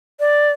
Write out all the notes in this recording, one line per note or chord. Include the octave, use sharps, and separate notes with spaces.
D5